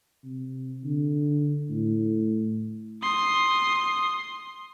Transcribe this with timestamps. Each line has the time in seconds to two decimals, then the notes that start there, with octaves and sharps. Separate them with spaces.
0.24 C3
0.84 D3
1.70 A2
3.03 C6 D#6